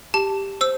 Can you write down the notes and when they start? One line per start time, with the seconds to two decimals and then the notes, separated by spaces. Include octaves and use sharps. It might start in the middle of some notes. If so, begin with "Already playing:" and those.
0.14 G4 A5
0.61 C5 E6